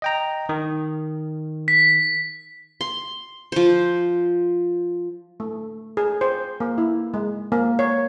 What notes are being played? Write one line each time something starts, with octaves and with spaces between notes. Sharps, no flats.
D#5 G5 A#5
D#3
B6
C6
F3 C5
A3
G#4
C5
A#3
E4
G#3
A#3
C#5